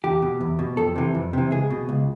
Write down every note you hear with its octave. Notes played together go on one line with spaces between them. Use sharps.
E2 G4
B2
E2
B2
F2 A4
C3 E3
F2
C3 E3
C#2 G#4
B2
C#2